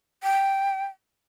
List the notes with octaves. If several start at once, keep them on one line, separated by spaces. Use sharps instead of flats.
G5